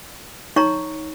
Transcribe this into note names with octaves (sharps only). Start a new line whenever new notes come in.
D#4 C#5 A#5 C#6